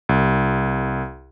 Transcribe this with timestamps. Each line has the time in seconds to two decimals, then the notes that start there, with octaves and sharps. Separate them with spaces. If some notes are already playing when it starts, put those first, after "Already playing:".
0.09 C2